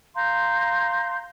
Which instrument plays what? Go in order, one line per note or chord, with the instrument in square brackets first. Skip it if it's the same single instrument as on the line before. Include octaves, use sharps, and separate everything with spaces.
[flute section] F5 A#5 C6 G6